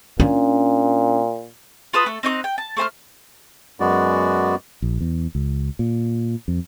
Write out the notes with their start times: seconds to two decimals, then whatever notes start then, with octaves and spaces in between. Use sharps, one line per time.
0.20 A#2 C#4 D4
1.93 F4 B4 A5 D#6
2.06 A3 A4
2.23 C4 D#4 C#6 F#6
2.44 G5
2.58 A5
2.77 A3 C5 A#5 F6
3.80 F#2 G#3 B3 F#4 D5
4.82 A#1
5.01 E2
5.35 C#2
5.79 A#2
6.48 F2